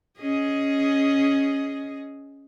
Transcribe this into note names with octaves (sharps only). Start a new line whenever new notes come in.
C#4 G#4 D#5